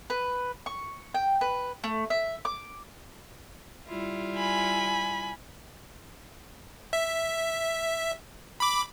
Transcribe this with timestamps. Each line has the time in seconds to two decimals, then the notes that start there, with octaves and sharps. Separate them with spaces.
0.10 B4
0.66 C#6
1.14 G5
1.41 B4
1.84 A3
2.10 E5
2.45 D6
3.87 G3 E4 F4
4.36 G#5 B5
6.93 E5
8.60 B5 D6